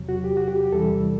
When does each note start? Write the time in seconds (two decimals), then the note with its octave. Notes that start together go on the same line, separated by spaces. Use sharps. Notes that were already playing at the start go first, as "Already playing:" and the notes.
Already playing: E2 C3 F#3
0.09 F#4
0.24 G4
0.37 F#4
0.48 G4
0.60 G4
0.72 E2 C3 E3 G3 A4